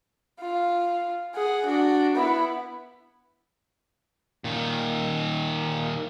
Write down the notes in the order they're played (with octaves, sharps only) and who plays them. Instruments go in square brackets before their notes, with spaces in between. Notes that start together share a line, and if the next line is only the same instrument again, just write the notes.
[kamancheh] F4
G#4 F#5
D4 F#4
B3 E4
[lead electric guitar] A#2 D#3